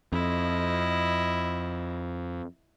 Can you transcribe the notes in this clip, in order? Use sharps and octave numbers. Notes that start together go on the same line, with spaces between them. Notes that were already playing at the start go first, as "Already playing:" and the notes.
F2 E4 D#5